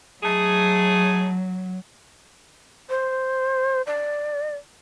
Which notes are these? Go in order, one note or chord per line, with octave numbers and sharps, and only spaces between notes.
F#3 A3 D#4 G#4
C5
D5